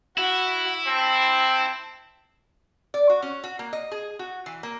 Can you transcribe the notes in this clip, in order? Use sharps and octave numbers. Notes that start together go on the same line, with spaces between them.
E4 F#4
C4 A5
D5
F#4
C#4
F#4
A#3
D#5
G#4
F#4
E3
A#3